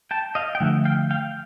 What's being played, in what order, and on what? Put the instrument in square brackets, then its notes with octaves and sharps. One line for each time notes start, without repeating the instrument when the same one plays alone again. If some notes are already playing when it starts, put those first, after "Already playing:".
[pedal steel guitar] G5 A5
D#5 F5
G5
[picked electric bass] D3 F3 A3 D4 [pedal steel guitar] E5 F#5
[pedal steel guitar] F5 G5
F5 G5